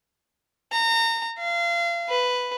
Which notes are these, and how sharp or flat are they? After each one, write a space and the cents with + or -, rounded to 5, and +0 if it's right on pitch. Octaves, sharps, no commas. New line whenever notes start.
A#5 -30
F5 -30
B4 +5